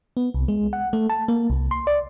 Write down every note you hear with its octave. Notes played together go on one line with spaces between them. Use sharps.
B3
C2
G#3
F#5
A3
A5
A#3
C2
C6
D5